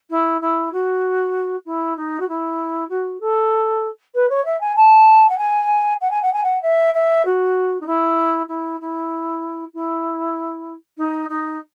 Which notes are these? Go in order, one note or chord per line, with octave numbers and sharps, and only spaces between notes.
E4
E4
F#4
E4
D#4
F#4
E4
F#4
A4
B4
C#5
E5
G#5
A5
F#5
G#5
F#5
G#5
F#5
G#5
F#5
E5
E5
F#4
D#4
E4
E4
E4
E4
D#4
D#4